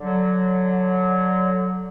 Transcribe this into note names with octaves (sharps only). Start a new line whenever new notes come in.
D3 F#3